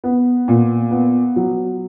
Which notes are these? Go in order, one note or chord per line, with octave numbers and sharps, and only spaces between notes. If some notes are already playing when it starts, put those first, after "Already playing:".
B3
A#2
B3
F#3